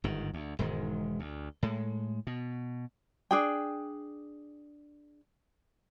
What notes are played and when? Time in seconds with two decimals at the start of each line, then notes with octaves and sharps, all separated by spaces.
0.04 G1 G#2 D#3
0.34 D2
0.59 E1 G#2 D#3 G#3
1.19 D2
1.63 A2 G#3
2.27 B2
3.31 D4 G#4 G5